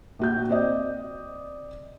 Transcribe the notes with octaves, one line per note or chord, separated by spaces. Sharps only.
A#1 F#4 G6
C4 D5 D#5